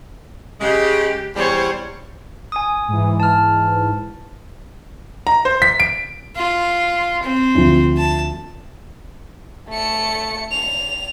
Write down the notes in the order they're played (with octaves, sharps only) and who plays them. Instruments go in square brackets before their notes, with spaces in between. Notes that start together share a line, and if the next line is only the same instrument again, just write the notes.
[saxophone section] C#3 G#3 [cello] G4
[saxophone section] E2 G3 [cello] C5 C#5
[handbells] G#5 D#6
[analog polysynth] G#2 E3
[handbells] A5 F6
[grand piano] A#5
C5
B6
D7
[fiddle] F4
C4
[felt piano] D2 F3
[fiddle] A5
[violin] A3 C#7
F7